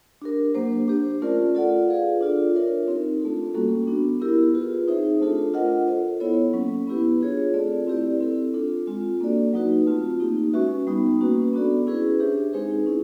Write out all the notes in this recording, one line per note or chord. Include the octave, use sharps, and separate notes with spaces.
D4 G4 A#4
F#3 A#3 D4 G4 C5
D4 G4 C5
A3 C#4 F4 A#4 D5
F4 A4 D5 F#5
F4 G#4 B4 D5 F5
D4 F4 A4 D5
D4 F4 A#4 C#5 E5
C4 D#4 G4 A#4
A3 D4 F4 A4
G3 A#3 C#4 F#4 A4
B3 D4 F#4
B3 E4 G4 A#4
F4 G#4 B4
C4 D#4 G#4 C5 E5
A3 D4 F4 A4 C5
D4 F4 A#4 D#5 F#5
F4 A4 C5 D#5
B3 E4 A4 C#5
F#3 A#3 C#4
B3 E4 G4 B4
D4 F4 G#4 C#5
A3 C4 F4 A4 D5
C4 E4 G4 B4 D5
C4 E4 A4
D4 F4 A4
G#3 C4 F4
A#3 D4 F#4 A4 D5
F#3 A#3 D#4 F#4 B4
A3 C4 F4
A#3 D#4 G4
G#3 C#4 F#4 B4 E5
G3 B3 D#4
A#3 C#4 F#4 B4
B3 D4 F#4 A4 D5
C#4 E4 G#4 B4
D4 G4 C5 E5
G#3 C4 D#4 G#4 B4
C#4 E4